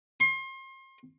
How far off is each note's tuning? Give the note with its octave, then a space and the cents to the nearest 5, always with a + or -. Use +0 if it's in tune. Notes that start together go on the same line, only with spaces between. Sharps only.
C6 +35